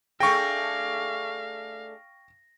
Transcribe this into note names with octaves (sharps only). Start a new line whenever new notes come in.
A3 D4 G#4 F5 G5 C#6 A#6